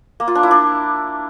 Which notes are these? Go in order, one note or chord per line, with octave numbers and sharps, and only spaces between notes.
A#3
F4
D4
E4
D4